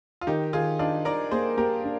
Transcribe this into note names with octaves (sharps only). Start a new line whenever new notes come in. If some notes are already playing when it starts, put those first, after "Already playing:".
F4
D#3 D#4 G4
D#3 F4 G#4
D4 D#4 F4
D#4 A#4 D5
A#3 G#4 C5
A#3 G4 A#4
D4